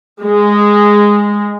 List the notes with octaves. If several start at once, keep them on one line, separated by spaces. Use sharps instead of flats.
G#3